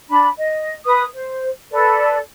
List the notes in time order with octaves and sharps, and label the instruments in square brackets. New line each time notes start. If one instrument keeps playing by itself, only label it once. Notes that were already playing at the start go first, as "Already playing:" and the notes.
[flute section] D4 B5
D#5
B4 D#6
C5
A4 B4 D5